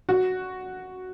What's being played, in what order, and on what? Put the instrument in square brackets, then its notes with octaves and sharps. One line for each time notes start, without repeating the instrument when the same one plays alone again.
[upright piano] F#4